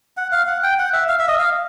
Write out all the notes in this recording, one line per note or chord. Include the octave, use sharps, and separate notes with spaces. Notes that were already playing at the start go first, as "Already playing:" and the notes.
F#5
F5
F#5
G5
F#5
E5
F5
E5
D#5
F5